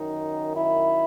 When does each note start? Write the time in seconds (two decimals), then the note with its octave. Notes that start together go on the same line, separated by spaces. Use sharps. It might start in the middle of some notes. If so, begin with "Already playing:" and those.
Already playing: F#2 D#3 D#4
0.55 E4